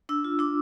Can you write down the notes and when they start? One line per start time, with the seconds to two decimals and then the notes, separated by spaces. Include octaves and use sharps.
0.09 D4 E6
0.24 F4
0.39 D4 D6